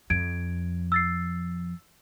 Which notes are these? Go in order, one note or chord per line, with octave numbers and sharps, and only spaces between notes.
F2 G#6 D7
E6 A6 C7